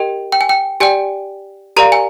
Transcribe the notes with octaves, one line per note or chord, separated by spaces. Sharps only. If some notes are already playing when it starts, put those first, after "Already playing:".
Already playing: G4 A#4 D#5 G5
G5
G#5
G5
G4 D5 G5 G#5
G4 A#4 D5 F5 A#5
G#5